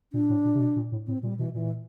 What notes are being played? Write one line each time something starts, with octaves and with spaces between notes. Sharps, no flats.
A#2 D4
A2
A#2
C3
B2
A#2
A2
A2 C4
A#2 G3
B2 E3
A#2 E3